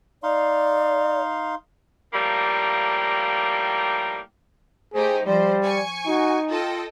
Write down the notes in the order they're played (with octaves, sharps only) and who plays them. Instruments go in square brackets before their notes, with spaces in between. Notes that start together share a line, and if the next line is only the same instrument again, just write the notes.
[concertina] D#4 F5 C6 [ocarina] D5
[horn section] A2 F3 G3 A#3 G5 A#5
[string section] A3 D#4 G4 [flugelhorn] G#4 [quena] C5
[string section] F3 C5 [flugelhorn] G3 [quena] D5
[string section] G#5 C#6
[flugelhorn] D#4 [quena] F#4
[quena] F4 [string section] A4 D#5 G5